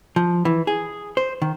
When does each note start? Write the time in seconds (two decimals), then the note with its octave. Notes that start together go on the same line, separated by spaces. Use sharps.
0.16 F3
0.45 E3
0.67 G#4
1.17 C5
1.42 D#3